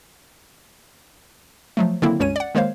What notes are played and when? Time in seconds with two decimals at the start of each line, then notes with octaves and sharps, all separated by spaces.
1.77 F3 F#3 A3
2.02 D3 D#3 F#3 A#3 C4 E4
2.20 C#2 G2 C#4 C#5 D#7
2.36 D5 F#5
2.55 D#3 G#3 A#3 C5 C#5 F5